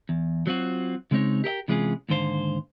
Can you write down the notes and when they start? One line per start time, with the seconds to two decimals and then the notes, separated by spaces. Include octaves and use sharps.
0.09 E2
0.47 F#3 C4 F4 F#4
1.11 C#3 G#3 C4 D4 D#4 C#5
1.44 G4 A#4 D#5 G5
1.68 C3 E3 G#3 C#4 F4 G#4
2.09 D#2 G#2 D3 C5 F5